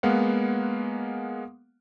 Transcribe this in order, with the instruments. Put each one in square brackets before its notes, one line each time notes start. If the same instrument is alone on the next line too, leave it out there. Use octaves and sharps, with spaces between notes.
[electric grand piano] G#3 A#3 B3 F5 F#5